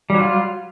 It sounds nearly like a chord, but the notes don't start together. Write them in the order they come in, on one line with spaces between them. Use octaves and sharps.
G3 F#3 F4